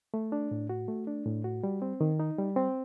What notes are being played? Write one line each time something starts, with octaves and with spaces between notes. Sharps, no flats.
A3
D4
A2
F#4
A3
D4
A2
F#4
G3
C4
D#3
D#4
G3
C4